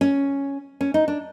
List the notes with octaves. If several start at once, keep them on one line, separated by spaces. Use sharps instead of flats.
C#4
C#4
D#4
D4